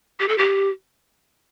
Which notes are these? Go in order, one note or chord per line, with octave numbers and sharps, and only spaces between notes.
G4
A4
G4